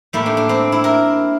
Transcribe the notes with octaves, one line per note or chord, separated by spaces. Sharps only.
A2 G3 A#3 E4
D4
D4
C4
E4
A#4